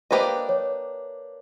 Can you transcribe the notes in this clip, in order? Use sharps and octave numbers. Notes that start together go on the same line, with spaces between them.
A#3 D4 G4 B4 C5 D#5
C#5